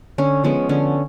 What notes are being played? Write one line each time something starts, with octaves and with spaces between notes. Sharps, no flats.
D3 C#4
F3 G#3 B3 C#4
D3 C#4